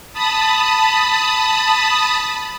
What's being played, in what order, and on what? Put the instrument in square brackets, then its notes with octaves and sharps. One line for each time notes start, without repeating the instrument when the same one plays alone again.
[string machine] A5 B5 D#6